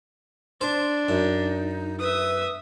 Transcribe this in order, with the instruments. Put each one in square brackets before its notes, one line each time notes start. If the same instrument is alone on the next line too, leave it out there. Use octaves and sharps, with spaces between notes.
[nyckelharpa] D4 [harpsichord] C5
[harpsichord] F#2 [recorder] D#4
[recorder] B4 [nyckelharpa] E5 D#6